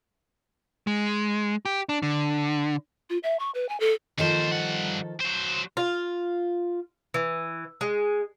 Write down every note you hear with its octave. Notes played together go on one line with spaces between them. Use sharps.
G#3
G4
D4
D3
F4
E5
C#6
B4
G#5
A4
D#2 D#3 F3 A4 C5
G2 F#5
F#3 C5
F4
E3
G#3